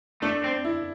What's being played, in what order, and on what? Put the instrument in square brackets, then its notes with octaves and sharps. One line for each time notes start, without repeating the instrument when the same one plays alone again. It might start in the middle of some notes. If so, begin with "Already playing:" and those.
[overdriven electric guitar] A3 [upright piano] D4
[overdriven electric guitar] C4
[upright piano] E4